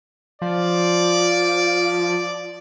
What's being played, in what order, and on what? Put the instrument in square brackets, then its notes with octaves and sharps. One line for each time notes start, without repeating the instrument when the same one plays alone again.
[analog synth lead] F3 [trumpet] D5